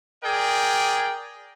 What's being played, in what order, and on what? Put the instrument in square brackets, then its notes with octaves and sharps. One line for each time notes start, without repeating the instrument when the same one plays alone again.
[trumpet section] G#4 A#4 D5 G5